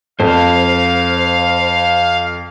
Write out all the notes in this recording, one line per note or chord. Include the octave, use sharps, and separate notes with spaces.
F2 C5 F5